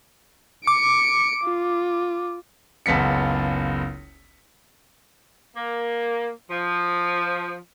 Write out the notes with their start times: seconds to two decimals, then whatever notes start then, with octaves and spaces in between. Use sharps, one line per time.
0.67 D6 C#7 D7
1.45 F4
2.86 F#1 C#2 B3 B6 C#7
5.55 A#3
6.49 F3